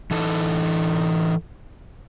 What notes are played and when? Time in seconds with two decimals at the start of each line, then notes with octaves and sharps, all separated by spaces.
0.11 E3 D#4 A4